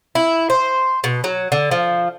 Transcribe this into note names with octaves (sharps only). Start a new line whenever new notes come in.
E4
C5
B2
F#3
D3
F3